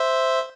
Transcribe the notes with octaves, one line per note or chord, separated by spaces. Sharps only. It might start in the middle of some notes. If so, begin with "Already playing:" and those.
Already playing: C5 E5